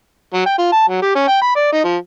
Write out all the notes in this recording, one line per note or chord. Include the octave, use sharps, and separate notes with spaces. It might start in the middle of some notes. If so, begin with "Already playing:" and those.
F#3
G5
F4
A5
F#3
G4
C#4
G5
B5
D5
D#4
F3